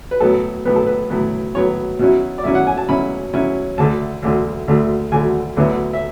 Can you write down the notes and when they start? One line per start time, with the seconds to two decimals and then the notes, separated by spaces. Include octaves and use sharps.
0.11 B4
0.20 A2 F#3 B3 A4
0.65 A2 F#3 B3 B4
0.76 A4
0.87 B4
1.10 A2 F#3 B3
1.55 A2 F#3 B3 C#5
1.99 B2 F#3 C#4 E4
2.38 D5
2.44 B2 F#3 C#4 E4 E5
2.55 F#5
2.67 G#5
2.77 A5
2.89 B2 F#3 C#4 E4 B5
3.33 B2 F#3 C#4 E4
3.78 D2 D3 A3 A5
4.22 D2 D3 A3
4.68 D2 D3 A3
5.12 D2 D3 A3 G#5
5.57 D2 D3 F#3 B3 E4
5.93 E5